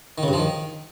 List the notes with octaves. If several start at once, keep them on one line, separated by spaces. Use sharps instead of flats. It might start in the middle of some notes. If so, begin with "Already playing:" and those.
D#3
C#3
G2
F3
D#3